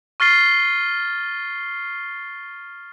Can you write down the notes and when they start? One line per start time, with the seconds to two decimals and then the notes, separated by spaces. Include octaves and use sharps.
0.20 C#6 F6 A6 C7 G7